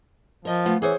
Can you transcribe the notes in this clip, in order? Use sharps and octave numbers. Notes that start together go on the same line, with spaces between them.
F3 A#4 D#5
A3 B3 F4
E3 G#4 C5 C#5